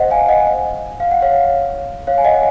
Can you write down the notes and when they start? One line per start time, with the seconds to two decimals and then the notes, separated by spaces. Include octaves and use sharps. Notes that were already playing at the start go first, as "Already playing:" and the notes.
Already playing: C5 D#5 F#5
0.10 F5 G#5
0.29 D#5 F#5
1.00 F5
1.11 F#5
1.22 C#5 F5
2.07 C#5 F5
2.18 G#5
2.25 D#5 F#5